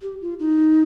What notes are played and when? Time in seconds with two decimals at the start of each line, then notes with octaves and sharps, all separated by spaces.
0.02 G4
0.21 F4
0.39 D#4